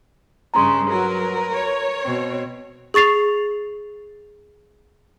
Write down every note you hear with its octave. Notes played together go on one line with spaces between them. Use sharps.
G2 C#3 G#3 A#5 C6
F#3 A#4 B4
C#5
B2 C4
G#4 C#6 A6 C7 F7